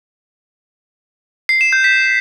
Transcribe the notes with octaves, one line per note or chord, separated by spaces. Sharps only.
C7
E7
G6
B6